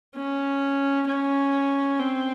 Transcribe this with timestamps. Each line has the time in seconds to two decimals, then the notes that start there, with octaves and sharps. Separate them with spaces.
0.15 C#4
1.07 C#4
2.00 C4